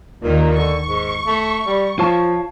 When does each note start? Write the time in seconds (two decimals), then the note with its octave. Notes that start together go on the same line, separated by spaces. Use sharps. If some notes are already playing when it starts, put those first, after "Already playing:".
0.23 D#2 A#2 D#3 A#3
0.56 D3 C#6
0.85 G#2
1.27 A3
1.66 G3
1.99 F3 F4 C#5 A5